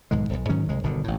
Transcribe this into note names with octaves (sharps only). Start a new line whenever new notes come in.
B1 G#2 D#3 G#3
D#1 B1
G#2 D#3 F#3 C#4
C2 G#3
G1 B2 D3 D#3
A1 A2